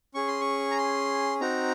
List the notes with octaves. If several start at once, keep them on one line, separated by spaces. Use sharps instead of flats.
C#4 G#4 C#6
C6
C#6
A#5
C6
C4 D#4 F#4 A#5